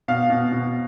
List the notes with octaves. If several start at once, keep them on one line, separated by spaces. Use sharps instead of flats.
B2 F5
B2
B2